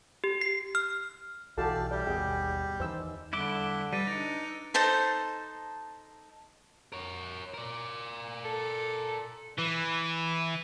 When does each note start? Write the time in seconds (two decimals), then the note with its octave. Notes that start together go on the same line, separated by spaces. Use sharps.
0.24 G4
0.41 C7
0.75 F6
1.58 B1 E3 F#4 G4 A4 D5 F5 A5
1.91 G3 G4 D5 E5
2.07 G#1 D#2 B2 G#4 G5
2.80 E2 D#3 C5 E6
3.33 E2 D3 G3 E4 D6 F#6 D7 G7
3.93 G3 B4 D6 E6 A6 D#7
4.07 D4 D#4 A#6 C#7
4.74 D#4 A4 C5 A5
6.92 A#4 C#5
7.54 A#4 D5
8.45 A4
9.59 E3